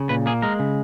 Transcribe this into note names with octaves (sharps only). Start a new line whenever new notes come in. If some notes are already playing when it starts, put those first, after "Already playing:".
Already playing: C#3
A#2 B4
A#3 G#4
G#3 A#4
C#3